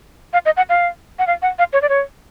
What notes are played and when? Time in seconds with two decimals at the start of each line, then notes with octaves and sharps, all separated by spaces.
0.33 F5
0.46 D#5
0.57 F#5
0.69 F5
1.19 F#5
1.27 F5
1.42 F#5
1.59 F5
1.73 C#5
1.82 D5
1.89 C#5